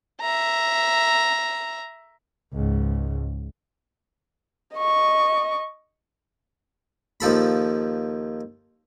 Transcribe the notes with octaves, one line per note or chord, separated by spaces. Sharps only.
E5 A#5
C#2 G#2
D#5 C#6
D#2 F3 A4 B5